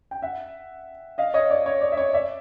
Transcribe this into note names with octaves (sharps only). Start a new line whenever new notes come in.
G5
E5 F#5
D#5 F5
C#5 D#5
D5
C#5
D5
E5
C#5 D#5
D5 E5